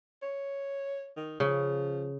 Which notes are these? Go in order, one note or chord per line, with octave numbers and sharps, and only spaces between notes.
C#5
D#3
C#3 F3